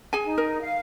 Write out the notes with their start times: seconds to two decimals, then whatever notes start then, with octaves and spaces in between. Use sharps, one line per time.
0.13 G#4 G#5
0.25 D#4
0.38 A#4
0.62 F5